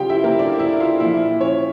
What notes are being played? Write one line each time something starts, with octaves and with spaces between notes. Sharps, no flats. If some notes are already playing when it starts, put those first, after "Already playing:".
Already playing: C#3 G3 F4 G4 F5 G5
E4 E5
A#3 A#4
D4 D5
E4 E5
F4 F5
A#2 F3 E4 E5
C#4 C#5